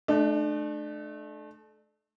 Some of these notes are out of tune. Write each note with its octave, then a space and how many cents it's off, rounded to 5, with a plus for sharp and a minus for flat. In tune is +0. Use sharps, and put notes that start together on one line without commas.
A3 -30 D4 +35